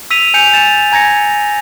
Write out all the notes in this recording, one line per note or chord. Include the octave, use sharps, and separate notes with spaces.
E6 B6 D#7 F7
G#5 G6 C#7 F7
G#5 A6 E7
G#5 A#5 G#6 A#6 C#7